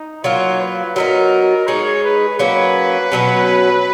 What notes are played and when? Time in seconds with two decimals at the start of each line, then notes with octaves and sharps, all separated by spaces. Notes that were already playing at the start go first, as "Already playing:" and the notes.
Already playing: D#4
0.24 F#3 A#3 F4 C#5
0.60 B4
0.96 F#3 B3 D#4 A#4
1.67 G#3 D#4 G#4 C#5
2.04 B4
2.39 F#3 A#3 C#4 B4
3.12 B2 F#3 C#4